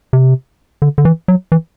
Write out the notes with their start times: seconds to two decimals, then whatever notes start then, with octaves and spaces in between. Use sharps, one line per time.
0.13 C3
0.82 D3
0.98 D3
1.05 E3
1.28 F#3
1.52 E3